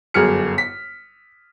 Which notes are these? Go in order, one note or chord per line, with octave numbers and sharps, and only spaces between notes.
G1 F#2 G#4 F6 C#7
B6